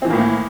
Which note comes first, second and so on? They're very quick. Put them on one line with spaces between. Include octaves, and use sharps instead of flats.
C4 E3 D#3 A#3 A2